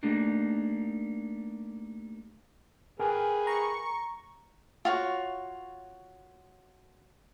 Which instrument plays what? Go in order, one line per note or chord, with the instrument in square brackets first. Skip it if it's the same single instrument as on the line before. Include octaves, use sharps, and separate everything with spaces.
[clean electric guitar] G3 A3 A#3 D4 D#4
[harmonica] G#4 B4 [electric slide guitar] A#4 G5 G#5
[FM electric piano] A#5 [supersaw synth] C#6
[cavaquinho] F4 F#4 C#5